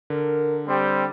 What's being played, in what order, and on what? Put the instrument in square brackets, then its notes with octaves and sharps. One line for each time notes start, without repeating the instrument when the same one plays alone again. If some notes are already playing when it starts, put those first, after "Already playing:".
[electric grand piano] D3 [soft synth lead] A#4
[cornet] G3 [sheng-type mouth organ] C4 [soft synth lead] C6